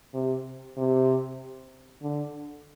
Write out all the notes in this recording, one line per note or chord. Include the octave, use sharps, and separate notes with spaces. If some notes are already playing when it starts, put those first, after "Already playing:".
C3
C3
D3